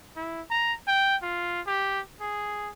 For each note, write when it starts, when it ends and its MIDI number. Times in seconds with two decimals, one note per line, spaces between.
0.16 0.42 64
0.51 0.73 82
0.88 1.16 79
1.22 1.61 65
1.67 2.00 67
2.21 2.70 68